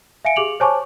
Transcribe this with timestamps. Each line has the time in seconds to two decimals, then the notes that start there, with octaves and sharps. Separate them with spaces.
0.25 E5 F5 G#5 C#7 D7
0.36 G4 G#4 D6 F7 F#7
0.60 C5 C#5 G#5 A5 C#6 D6